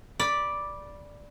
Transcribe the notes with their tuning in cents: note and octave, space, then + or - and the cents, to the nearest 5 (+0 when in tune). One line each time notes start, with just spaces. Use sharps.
D5 +0 B5 -15